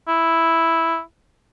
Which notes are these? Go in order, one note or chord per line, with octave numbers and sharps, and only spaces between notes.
E4